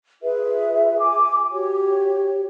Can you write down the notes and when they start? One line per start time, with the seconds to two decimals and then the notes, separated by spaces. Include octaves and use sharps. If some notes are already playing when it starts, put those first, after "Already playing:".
0.22 F4 G#4 B4 E5
0.99 G#5 D6
1.50 F#4 G4 C#5